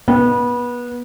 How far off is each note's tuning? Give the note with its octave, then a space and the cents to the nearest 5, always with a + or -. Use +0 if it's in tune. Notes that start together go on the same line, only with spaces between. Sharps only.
B3 -25